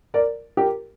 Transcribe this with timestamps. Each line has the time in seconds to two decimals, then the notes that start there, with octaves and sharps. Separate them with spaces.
0.14 A#4 D5
0.57 G4 A#4